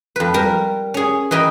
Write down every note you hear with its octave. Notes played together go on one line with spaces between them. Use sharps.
F2 B4
G3 A#4
C#4 G#4
E3 A#4 D#5 G5 B5